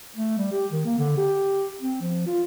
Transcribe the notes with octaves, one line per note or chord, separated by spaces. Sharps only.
A3
G3
G4
D#3
A#3
D3
G4
C4
F3
F4